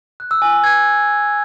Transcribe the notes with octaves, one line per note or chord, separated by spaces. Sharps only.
F#6
E6
G#5
G#5
G#6